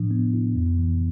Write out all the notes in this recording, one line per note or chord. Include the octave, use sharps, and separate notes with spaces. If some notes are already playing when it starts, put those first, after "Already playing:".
Already playing: A2 F3 D4
B3
E4
F2
E3